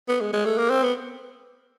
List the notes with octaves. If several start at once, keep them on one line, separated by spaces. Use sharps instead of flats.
B3
G#3
G#3
A3
A#3
C4
B3